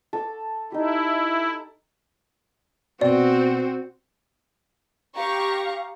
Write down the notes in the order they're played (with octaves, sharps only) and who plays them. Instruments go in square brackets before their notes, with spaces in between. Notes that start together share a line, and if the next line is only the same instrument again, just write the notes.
[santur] A4 D6
[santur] D#4 G4 [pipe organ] E4
[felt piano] B2 G5 [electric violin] C4 F#4 [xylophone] D5
[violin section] G4 A#5 C#6 [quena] F5